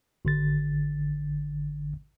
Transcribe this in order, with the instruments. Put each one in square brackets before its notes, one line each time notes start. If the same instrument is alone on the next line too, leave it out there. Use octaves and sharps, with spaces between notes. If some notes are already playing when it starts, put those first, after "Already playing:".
[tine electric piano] G#1 D3 A6